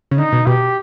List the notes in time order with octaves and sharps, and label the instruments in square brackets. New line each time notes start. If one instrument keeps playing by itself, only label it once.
[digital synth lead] C#3
[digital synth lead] D3 [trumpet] D#4
[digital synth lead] B2
[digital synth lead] B2 [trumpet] G4